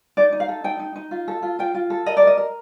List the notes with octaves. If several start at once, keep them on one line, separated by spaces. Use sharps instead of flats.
D#4 D5
D#4
F5
A4
D#4 G5
D#4
D#4
F4
A4
F4
F4 G5
F4
A4
A#4 D#5
D5
A#4
D#5
A#4